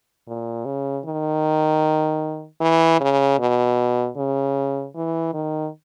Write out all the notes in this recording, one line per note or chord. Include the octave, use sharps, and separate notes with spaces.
A#2
C#3
D#3
E3
C#3
B2
C#3
E3
D#3